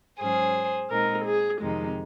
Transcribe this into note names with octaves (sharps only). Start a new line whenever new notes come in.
G#2 F#3 C#4 G#4 C5
A#2 G#3 C4 D#4 A#4
G#4
F2 C3 D#3 G#3 D#4